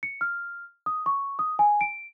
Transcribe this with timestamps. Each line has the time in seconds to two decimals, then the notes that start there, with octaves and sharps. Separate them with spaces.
0.03 C#7
0.21 F6
0.86 D#6
1.06 C#6
1.39 D#6
1.59 G#5
1.81 D7